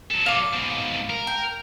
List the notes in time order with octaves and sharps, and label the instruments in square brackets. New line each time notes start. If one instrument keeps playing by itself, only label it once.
[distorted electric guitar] F#3 A4
[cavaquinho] F5 D6
[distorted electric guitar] G#2 B2
A#4
[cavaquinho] G5